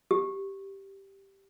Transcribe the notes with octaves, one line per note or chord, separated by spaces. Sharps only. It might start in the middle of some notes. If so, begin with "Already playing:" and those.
G4